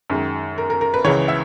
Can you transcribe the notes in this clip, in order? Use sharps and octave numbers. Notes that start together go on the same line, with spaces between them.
F#2 D#3 G#3
A#4
A#4
A#4
B4
C#2 C#3 E3 C#5
E5